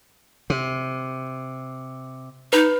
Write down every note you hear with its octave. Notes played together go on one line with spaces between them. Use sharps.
C3
D#4 B4